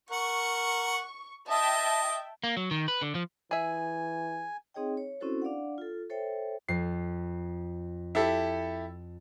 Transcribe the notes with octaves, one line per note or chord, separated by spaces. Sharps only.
A#4 F#5 C#6
D#5 E5 G5 A5
A#3
F#3
D#3
B4
D3
F3
E3 G#4 E5 G#5
C4 D#4 G#4 C#5 D#5 G5
C#5
C4 C#4 E4 F#4 A4 C5
D4 D5 F5 F#5
F4 A4
A4 C5 C#5 E5 G5
F2 C7
E4 G4 A4 C7